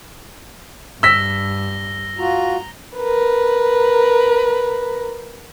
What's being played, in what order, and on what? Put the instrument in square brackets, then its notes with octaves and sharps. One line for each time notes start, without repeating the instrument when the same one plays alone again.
[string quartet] G2 [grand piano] E6 B6 [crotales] A#6 G7
[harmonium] F4 F#4 [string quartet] A#5
[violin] A#4 B4